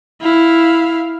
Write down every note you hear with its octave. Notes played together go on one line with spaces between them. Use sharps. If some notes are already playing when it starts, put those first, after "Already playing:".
E4 F5